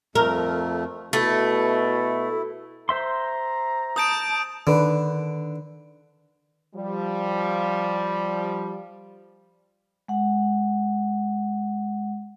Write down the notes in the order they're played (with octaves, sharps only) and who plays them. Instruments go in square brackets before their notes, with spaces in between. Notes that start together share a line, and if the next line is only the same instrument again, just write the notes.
[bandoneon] F2 A3 [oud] A#4
[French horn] B2 [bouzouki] A3 [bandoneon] E4
[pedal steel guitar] C5 E5 C6 [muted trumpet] A#5
[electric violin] A5 [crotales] D#6 G6 D7
[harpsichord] D3 [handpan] D#3 D4 B4
[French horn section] F3 G3
[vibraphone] G#3 F#5